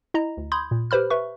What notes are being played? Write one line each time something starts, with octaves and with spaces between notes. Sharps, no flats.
E4 D#5 A#5
D2
B5 C6 D#6 G6 G#6
A#2
G4 B4 C5 B5 F6
B4 E5 C#6